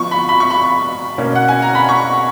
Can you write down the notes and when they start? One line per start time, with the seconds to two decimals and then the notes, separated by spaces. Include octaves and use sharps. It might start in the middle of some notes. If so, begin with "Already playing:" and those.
Already playing: F3 B3 C#6
0.11 B5
0.29 B5
0.40 C#6
0.50 B5
1.18 B2 A#3 C#4
1.35 F#5
1.48 G#5
1.62 A#5
1.75 B5
1.89 C#6